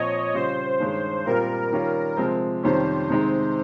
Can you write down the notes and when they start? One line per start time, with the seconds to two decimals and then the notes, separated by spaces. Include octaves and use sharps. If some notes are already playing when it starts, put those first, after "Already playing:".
Already playing: A#2 F3 C4 C#5 D#5
0.34 C#3 G3 C#4 F4 C5
0.80 G2 D#3 G#3 C#4
1.26 A#2 G3 C4 F4 A#4
1.72 D#3 G3 C#4 F4
2.17 C3 F3 G#3 C4
2.63 F2 C3 D#3 G3 C#4 C5
3.09 C3 D#3 G#3 C4 D#4